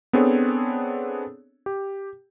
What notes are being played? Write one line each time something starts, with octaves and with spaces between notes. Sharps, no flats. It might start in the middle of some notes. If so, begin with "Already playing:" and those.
B3 C4 D4 G#4 A4 C#5
G4